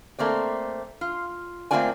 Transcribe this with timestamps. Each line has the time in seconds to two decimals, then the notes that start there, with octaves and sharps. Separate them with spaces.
0.19 A3 A#3 C4 D5
1.01 F4
1.71 A3 A#3 C4 F4 D5 G#5